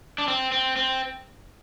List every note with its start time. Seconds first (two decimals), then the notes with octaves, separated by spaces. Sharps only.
0.18 D4
0.28 C4
0.52 C4
0.76 C4